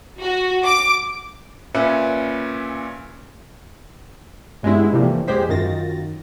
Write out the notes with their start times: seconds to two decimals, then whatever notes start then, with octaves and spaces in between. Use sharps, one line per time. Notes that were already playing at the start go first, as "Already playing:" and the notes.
0.21 F#4
0.66 D6
1.74 A#2 C#4 B4 E5 B5 C#7
4.63 G2 G#3 B3 C#4 E4
4.93 C3 E3 F3 G3 A3 A#3
5.28 E2 G#3 G4 G#4 C5 B6
5.49 F#2 D#3 F4 A6 A#6